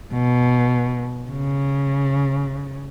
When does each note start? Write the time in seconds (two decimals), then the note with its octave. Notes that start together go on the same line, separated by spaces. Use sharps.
0.13 B2
1.31 C#3